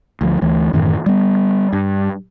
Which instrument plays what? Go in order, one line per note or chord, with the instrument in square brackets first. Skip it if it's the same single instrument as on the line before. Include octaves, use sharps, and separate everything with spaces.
[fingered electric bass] D2 F3
D2 E3 A3
F#2 A2 D#3 E3
G3 B3
G2